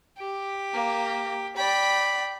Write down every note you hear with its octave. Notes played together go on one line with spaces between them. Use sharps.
G4
A#3
D5 G5 B5